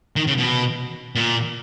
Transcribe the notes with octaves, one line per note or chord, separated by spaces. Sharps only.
D#3
C#3
B2
A#2